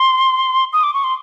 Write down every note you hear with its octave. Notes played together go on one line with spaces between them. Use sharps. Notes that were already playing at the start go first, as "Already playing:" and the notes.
Already playing: C6
D#6
D6
C#6
C6